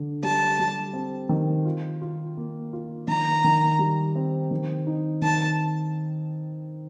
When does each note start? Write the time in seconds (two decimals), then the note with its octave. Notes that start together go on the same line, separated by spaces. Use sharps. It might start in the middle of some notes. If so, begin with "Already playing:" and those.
Already playing: D3
0.23 G3 A5
0.59 G3
0.93 C4
1.29 D#3
1.65 F4
2.02 F4
2.37 A#3
2.73 F4
3.08 D#3 A#5
3.44 D#3
3.79 G3
4.16 C4
4.51 D#3
4.87 D#4
5.22 D#3 A5